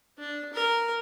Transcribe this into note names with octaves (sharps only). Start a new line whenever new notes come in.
D4
A#4